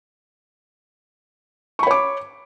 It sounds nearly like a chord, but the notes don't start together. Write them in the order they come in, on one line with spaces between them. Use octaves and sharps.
C#6 B5 C#5 D6